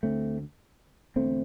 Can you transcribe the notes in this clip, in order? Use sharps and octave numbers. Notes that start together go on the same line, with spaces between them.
D2 D3 A3 C4
E1 E2 D3 A3 C4